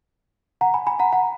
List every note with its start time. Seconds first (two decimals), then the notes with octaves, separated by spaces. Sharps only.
0.61 F#5 A#5
0.74 G#5 B5
0.87 G#5 B5
0.99 F#5 A#5
1.13 F#5 A#5